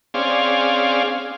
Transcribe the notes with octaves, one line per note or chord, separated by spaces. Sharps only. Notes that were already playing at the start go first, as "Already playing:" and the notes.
C4 C#4 G#4 D5 F5